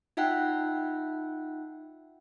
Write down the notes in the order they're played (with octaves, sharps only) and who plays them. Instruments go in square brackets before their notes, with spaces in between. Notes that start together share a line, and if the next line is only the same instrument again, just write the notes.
[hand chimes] D#4 F4 E5 F#5 G5 F#6